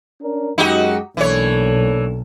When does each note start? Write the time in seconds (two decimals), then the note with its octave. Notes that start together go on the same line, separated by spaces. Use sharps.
0.21 C#4 D4 A#4
0.58 F#2 G#3 D#4 F#4 G4
1.17 B1 E3 A#3 D4 A4 C#5